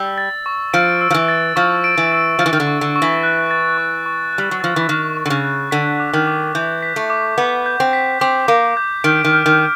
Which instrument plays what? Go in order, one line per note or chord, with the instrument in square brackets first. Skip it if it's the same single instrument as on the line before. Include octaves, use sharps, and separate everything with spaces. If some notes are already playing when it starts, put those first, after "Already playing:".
Already playing: [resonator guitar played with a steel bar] G3 [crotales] E6
[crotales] A6
C#6
[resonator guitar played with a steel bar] F3 [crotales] D7
[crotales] E6
[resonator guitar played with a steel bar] F3
E3
[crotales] A6
[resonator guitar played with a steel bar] F3 [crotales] C#6
[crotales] D7
[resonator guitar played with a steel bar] E3
[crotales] E6
[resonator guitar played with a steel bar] F3 [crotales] A6
[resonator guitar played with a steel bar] E3
D#3
D3
[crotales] C#6
[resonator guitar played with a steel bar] D3
[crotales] C#6
[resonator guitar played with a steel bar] E3
[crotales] F#6
A6
C#6
C#6
F#6
[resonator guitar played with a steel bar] G3
F#3
[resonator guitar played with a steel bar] F3 [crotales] A6
[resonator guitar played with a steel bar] E3
[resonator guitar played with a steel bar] D#3 [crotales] C#6
[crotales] C#6
[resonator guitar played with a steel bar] D3
C#3
[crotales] F#6
[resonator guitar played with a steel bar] D3 [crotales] B6
[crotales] D6
[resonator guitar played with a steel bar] D#3
[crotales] D6
[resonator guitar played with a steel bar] E3 [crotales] G6
[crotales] B6
[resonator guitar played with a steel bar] A3
[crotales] D6
[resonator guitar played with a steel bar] B3 [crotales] D6
[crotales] G6
[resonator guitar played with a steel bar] C4
[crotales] B6
[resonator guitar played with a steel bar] C4 [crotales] D6
[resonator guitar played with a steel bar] A#3 [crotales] D6
[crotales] G6
[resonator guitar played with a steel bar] D#3 [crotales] D7
[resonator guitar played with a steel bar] D#3
[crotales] F6
[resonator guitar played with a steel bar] D#3
[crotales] F6